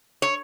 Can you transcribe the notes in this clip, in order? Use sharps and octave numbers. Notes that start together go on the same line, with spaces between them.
C#5